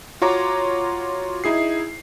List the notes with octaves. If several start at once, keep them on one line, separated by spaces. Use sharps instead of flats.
F4 F#4 C#5 A#5 D6
D#4 E4 G#4 C7